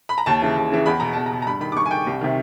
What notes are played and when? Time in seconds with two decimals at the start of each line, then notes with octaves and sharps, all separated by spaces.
0.09 B5
0.18 A#5
0.26 D#2 A5
0.42 C#3 E3
0.56 D#2
0.72 C#3 E3
0.86 E2 B5
1.00 B2 A#5
1.13 E2 A5
1.26 A#5
1.32 B2
1.42 A#5
1.46 G2 B5
1.61 D#3 B5
1.72 D6
1.76 G2 C#6
1.86 G#5
1.91 D#3 G5
2.07 C2
2.21 C3 D#3